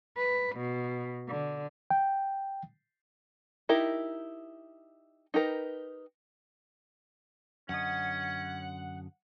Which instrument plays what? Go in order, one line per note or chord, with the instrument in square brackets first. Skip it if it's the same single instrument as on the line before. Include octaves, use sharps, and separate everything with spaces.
[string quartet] B4
B2
D3
[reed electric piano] G5
[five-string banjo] D#4 E4 G4 A#4
D#4 G4 A#4 B4
[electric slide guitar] F#2 D3 D#5 [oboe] C#4 [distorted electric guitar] F#5